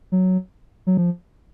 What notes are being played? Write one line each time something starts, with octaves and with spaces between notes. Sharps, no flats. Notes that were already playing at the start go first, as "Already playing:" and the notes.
F#3
F#3
F3